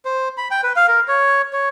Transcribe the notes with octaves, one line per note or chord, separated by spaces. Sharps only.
C5
B5
G5
B4
F5
A#4
C#5
C#5